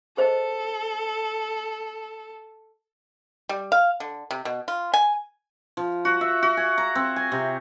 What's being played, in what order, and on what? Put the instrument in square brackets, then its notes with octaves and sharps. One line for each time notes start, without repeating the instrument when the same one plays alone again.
[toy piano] G#4 C5 D#5 [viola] A4
[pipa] G3
F5
D3
C3
B2
F4
G#5
[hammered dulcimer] F3
F#4
E5
F#4
G#5
A#5
C4
G#5
C3